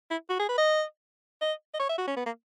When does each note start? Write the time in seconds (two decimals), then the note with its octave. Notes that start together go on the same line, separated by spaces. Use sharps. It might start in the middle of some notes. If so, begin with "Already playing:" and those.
0.11 E4
0.30 F#4
0.39 G#4
0.49 B4
0.58 D#5
1.42 D#5
1.74 D#5
1.79 C#5
1.89 E5
1.98 F#4
2.08 C#4
2.17 B3
2.26 A#3